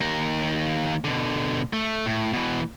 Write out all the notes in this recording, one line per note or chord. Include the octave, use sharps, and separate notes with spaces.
D#2 A#4
B2 D3
A3
A2
B2 E3